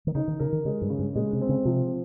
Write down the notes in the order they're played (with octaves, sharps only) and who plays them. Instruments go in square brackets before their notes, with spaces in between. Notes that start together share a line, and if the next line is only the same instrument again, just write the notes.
[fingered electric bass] D#3
[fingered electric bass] C#3 [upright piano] D#4
[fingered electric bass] D#3
[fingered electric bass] C#3 [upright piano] A#4
[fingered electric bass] D#3
[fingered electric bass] C#3 [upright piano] G#3
[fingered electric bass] G2
[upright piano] C#3
[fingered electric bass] G2
[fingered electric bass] A#2 [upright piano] G#3
[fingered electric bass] C3
[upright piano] C4
[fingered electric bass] C#3
[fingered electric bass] C3 [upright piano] F3